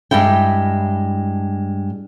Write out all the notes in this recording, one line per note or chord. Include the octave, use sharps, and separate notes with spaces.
G2 G3 G#3 E4 G5